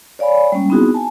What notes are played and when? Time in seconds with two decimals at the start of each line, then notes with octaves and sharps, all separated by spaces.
0.19 C#5 D5 F5 G#5 B5
0.52 G3 G#3 A#3 C#4
0.70 B3 C4 D#4 E4 F#4 G#4
0.94 G#5 A5